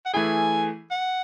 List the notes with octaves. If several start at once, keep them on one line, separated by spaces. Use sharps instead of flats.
F#5
E3 A3 E4 G#4 G#5
F#5